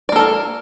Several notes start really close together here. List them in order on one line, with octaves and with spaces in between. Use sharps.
D5 A#3 A4 A#4